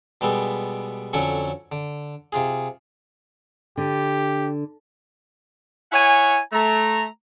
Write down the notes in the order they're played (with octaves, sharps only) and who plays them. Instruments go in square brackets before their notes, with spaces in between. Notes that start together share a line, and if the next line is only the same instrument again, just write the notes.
[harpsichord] B2 G3 G#3 B3 A4
F2 D3 F#3 C#4 A4 C#6
D3
C3 F4 G#4
[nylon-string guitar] D3 [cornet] G4
[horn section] E4 C#5 F#5 G#5
A3 A#5